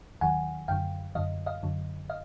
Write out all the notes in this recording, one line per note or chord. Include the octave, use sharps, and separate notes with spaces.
D#2 D#3 F#3 F#5 G#5
F#2 D3 F#3 F5 G5
F#2 D3 F#3 D#5 F5
D#5 F5
F#2 D3 F#3
D#5 F5